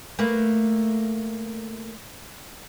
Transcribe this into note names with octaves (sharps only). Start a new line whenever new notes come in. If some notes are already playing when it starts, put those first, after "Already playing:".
A3 A#3 B4